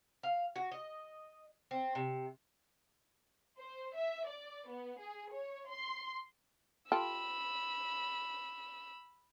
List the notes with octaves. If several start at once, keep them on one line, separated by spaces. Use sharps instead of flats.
F5
F#4
D#5
C4
C3
C5
E5
D5
B3
G#4
C#5
C6
F4 G4 A4 B5 E6